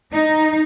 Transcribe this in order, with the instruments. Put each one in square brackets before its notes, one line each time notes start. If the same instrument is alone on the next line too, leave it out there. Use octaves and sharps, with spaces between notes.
[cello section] D#4